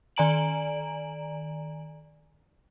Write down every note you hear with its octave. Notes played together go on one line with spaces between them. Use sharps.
D#3 D5 G#5 A#5 D7 F#7